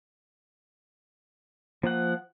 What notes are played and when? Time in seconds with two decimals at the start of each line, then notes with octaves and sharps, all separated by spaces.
1.83 F3 A#3 F#5